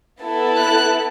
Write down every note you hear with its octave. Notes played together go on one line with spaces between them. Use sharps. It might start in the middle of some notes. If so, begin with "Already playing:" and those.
B3 E4 A4
F#6